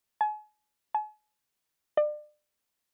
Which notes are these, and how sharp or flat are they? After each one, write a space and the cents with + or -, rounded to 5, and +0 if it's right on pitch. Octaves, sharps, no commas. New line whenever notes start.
G#5 +40
G#5 +45
D5 +35